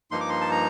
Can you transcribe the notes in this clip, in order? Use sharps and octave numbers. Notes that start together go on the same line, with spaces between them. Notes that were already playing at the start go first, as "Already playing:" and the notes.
G2 F3 A#3 D#4 C6
D6
C6
A5
A#5